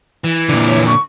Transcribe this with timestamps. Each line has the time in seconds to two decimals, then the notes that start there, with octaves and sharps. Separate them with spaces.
0.24 E3
0.49 A#2 D3
0.67 C#5
0.86 C#6